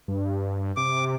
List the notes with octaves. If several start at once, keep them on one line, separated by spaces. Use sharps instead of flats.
G2
C3 D6